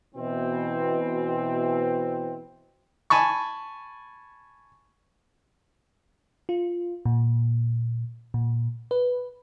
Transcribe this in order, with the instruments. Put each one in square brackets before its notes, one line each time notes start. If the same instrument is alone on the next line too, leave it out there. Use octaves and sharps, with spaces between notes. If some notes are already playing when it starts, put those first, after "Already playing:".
[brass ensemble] B2 E3 C4
[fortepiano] G#5 A5 B5 C#6
[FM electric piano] F4
A#2
A#2
B4